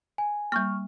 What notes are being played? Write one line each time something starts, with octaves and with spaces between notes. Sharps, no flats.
G#5
G3 A#3 C#6 F6